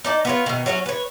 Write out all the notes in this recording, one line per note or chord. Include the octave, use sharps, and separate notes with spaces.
D#4 D5 A5
B3 F4 C#5
B2 D#3
F#3 C#4 E4 F#4
B4 C#5